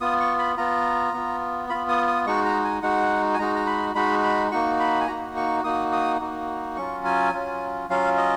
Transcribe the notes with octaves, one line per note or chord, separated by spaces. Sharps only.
B3 F4 D#6
C#6
B5
B3 F4 A#5
B3 F4
B3 F4 B5
D#6
D#6
G#3 D#4 F#4 C#6
A#5
G#5
G#3 D#4 F#4 F#5
G#5
G#3 D#4 F#4 A#5
A#5
B5
G#3 D#4 F#4 B5
B5
A#3 D#4 F#4 C#6
B5
G#5
A#3 D#4 F#4 A#5
C#6
A#3 D#4 F#4 D#6
D#6
A#3 D#4 F#4
F#3 C#4 F4 C#6
G#5
F#3 C#4 F4
F#3 C#4 F4 F5
D#5